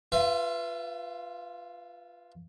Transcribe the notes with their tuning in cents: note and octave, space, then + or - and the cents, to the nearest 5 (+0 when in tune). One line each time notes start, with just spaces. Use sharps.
F4 +0 B4 +0 E5 +35